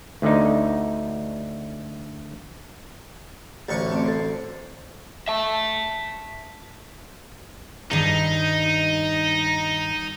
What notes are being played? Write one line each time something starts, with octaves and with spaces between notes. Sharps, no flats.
D2 D3 D#4
A1 D2 A4 C#6
A3 C4 D5
A4 C5
E5 A5
G2 D#3 D#4